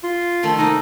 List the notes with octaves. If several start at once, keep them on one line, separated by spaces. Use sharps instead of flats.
F4
D#3 F3 A3
C3 A#3 D#4 E4